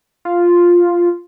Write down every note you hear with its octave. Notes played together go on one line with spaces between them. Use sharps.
F4